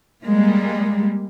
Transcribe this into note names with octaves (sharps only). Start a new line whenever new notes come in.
G3 G#3 A#3